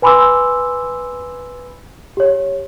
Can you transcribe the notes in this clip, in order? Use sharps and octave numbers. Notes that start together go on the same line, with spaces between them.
B4 G#5 B5 C6 D6 E6
G4 C#5